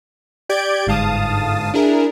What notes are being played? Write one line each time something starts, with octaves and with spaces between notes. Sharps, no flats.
G4 D5 G6 G#6 D7
G1 G#2 F5 A5 D#6
D4 E4 G#4 A#4